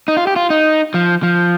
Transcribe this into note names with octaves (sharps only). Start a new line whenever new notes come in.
D#4
F4
G4
F4
D#4
F3
F3